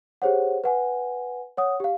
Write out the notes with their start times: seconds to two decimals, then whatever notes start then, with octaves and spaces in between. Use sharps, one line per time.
0.22 G4 G#4 C5 C#5 F#5
0.64 B4 F#5 G#5
1.57 C#5 F#5 D#6
1.80 G4 F5